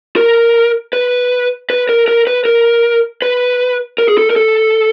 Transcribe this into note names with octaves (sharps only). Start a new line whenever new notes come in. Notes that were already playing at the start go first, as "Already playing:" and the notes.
A#4
B4
B4
A#4
A#4
B4
A#4
B4
A#4
G#4
A4
A#4
A4